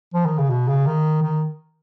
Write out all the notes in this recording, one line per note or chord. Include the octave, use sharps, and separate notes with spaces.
F3
D#3
C#3
B2
C#3
D#3
D#3